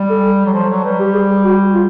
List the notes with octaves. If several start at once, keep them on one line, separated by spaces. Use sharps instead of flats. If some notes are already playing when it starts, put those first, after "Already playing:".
Already playing: G3
A4
F#3
F3
F#3
G3 B4
G4
G#4
F#4
F4